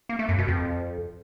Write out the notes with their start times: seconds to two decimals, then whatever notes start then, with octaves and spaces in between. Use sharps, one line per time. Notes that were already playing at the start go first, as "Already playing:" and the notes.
0.09 A#3
0.19 A3
0.29 F#2
0.38 B2
0.48 F2